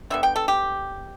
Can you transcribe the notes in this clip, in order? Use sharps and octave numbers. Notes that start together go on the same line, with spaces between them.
D3 G3 B3 E5
G5
A4
G4